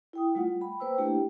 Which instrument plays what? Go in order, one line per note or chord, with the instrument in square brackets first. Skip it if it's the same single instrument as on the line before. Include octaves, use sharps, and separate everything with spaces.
[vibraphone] E4 G5 D#6
G3 A3 F4 F#5
G5 B5
A#3 B4 C5 G5 E6
A3 A#3 D4 E4 G4 G5